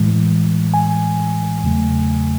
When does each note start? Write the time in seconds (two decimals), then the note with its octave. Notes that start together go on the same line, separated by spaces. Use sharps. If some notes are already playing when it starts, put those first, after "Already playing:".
Already playing: A2 E3 G#3
0.74 G#5
1.63 E2 C#3 F#3 A3